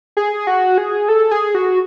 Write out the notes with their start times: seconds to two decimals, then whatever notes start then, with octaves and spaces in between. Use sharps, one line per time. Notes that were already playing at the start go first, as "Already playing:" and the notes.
0.17 G#4
0.47 F#4
0.78 G#4
1.09 A4
1.31 G#4
1.55 F#4